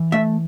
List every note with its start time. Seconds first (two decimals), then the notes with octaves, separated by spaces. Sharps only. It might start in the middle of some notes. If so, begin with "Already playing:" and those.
Already playing: E3
0.12 A3 E5